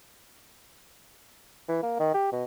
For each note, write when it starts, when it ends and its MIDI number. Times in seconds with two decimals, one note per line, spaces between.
1.69 1.79 52
1.83 1.99 58
2.00 2.09 51
2.14 2.29 67
2.32 2.44 47